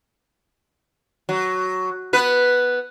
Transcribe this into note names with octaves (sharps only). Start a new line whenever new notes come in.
F#3
B3 B4